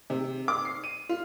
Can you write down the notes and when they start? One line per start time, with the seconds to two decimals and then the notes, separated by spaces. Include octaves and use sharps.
0.10 C3
0.48 D6
0.65 C7
0.84 D#7
1.09 F4